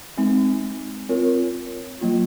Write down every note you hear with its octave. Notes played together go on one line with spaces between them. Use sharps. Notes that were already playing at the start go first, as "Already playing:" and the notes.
G#3 C4 D#4
C4 F4 A#4 C#5
F#3 A#3 F4